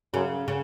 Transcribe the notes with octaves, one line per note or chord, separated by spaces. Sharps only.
F#2 C#3
C#3